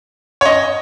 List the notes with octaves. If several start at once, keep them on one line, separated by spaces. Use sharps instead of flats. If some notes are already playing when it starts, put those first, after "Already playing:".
C#5
D#5